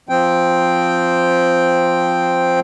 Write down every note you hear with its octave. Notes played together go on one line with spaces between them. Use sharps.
F3 C4 G5